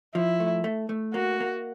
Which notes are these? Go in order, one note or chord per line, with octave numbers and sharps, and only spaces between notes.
F3 E4
A3
A3
A3
A#3 F#4
A#3